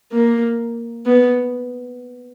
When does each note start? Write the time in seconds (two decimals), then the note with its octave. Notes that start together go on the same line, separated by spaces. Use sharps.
0.12 A#3
1.06 B3